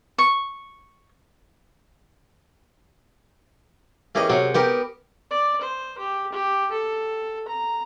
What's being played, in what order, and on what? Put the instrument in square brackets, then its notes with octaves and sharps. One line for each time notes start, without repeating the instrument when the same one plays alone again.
[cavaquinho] C#6
[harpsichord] E3 G4 D#5 [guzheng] C#4 G#4 A#4
[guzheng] C3 F#5 [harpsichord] F#3
[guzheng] B3 G4 A#4 [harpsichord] G5
[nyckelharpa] D5
C5
G4
G4
A4
A#5